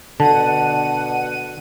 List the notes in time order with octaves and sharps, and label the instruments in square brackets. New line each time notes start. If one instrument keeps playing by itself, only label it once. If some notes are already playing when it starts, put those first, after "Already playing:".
[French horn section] B2 D4 [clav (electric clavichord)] D3 [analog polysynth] F#5 D#7 [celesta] A5